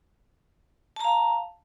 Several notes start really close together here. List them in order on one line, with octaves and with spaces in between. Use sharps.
A5 A#5 F5